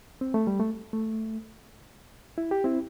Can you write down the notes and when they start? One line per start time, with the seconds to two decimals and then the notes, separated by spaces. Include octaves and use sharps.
0.21 C4
0.34 A3
0.47 G3
0.60 A3
0.93 A3
2.38 E4
2.51 G4
2.64 C4 E4